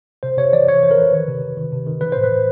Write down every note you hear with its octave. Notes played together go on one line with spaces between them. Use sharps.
C3 C5
C3 C#5
E3 D5
E3 C#5
E3 C5
A#4
E3 B4
D#3
C3
C3
D#3
C3
D#3
E3 B4
A2 C5
B4
E3